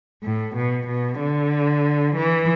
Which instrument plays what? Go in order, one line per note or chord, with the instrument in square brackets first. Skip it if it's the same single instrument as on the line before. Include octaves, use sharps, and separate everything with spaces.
[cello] A2
B2
B2
D3
E3